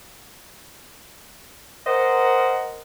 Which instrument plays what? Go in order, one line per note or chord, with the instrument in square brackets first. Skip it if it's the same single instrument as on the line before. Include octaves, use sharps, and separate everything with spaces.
[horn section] A#4 C5 D#5 F#5